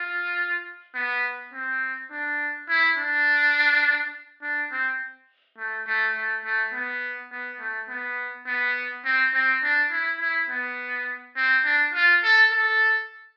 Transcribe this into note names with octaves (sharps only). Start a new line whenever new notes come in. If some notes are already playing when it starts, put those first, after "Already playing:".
Already playing: F4
B3
C4
D4
E4
D4
D4
C4
A3
A3
A3
A3
B3
B3
A3
B3
B3
C4
C4
D4
E4
E4
B3
C4
D4
F4
A4
A4